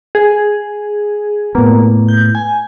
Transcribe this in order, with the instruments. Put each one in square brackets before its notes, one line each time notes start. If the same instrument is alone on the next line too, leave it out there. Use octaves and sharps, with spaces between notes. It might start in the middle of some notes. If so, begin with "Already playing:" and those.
[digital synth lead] G#4
[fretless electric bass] A2 B3 [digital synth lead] A#3
[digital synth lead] G6
G#5